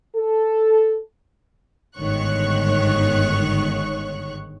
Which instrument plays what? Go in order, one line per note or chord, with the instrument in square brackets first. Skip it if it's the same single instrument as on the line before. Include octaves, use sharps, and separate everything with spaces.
[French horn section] A4
[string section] G1 G#2 D#3 C#5 C#6 F#6